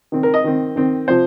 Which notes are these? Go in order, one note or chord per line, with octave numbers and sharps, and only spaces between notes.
D#3 C4
A#4
D#5
D#3 C4
D#3 C4
C3 F3 C5